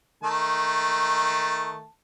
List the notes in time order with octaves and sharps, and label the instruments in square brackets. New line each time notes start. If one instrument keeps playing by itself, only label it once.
[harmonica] D#3 A3 A5